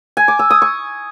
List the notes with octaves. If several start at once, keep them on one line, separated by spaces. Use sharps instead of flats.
G#5
D6
E6
D#6
C#6